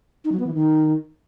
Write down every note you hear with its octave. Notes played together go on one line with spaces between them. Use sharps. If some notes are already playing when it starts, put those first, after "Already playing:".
D#4
F#3
B3
E3
D#3